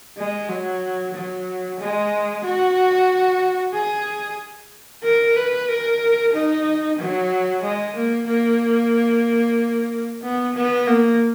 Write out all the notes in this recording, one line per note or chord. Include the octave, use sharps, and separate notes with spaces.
G#3
F#3
F#3
G#3
F#4
G#4
A#4
B4
A#4
D#4
F#3
G#3
A#3
A#3
B3
B3
A#3